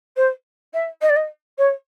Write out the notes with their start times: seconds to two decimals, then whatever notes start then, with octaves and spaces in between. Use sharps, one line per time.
0.16 C5
0.73 E5
1.01 D#5
1.09 D5
1.16 D#5
1.58 C#5